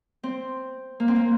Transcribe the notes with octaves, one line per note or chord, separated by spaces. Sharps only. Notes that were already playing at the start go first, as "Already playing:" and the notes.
C4
A#3
C4
A#3